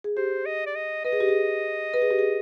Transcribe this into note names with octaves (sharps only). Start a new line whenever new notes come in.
G#4
G4 C5
D#5
D5
D#5
B4 D#5
G#4
G4
G#4
B4
G#4
G4
G#4